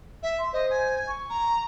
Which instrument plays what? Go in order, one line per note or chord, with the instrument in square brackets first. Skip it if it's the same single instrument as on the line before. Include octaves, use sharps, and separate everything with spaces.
[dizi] E5
[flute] C6
[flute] C5 [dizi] D#5
[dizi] G#5
[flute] C#6
[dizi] A#5